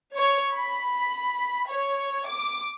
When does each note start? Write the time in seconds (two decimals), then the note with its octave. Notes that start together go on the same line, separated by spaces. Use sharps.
0.14 C#5
0.55 B5
1.70 C#5
2.27 D6